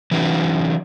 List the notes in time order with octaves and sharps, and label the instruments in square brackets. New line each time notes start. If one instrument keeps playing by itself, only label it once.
[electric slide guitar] E3 F#3 C#4 D#4